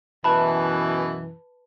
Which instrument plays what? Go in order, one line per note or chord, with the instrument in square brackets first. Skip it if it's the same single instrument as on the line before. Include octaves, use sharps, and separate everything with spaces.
[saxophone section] F#2 B2 E3 [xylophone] B4 A5 B5